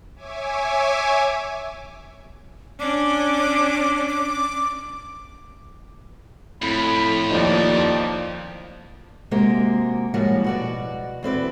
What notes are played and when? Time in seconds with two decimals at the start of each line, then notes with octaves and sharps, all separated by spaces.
0.16 C#5 E5 G#5 D6
2.80 C#4 D4 D6
4.09 D6
6.62 F2 A2 B5
7.30 D#2 F3 D#4 D5
9.31 C3 G#3 A#3 F#4 G4 A#4
10.14 A2 F3 G3 G#3 A#3 F#4
10.44 B2 F#4 D5
11.23 E2 C4 B4 D5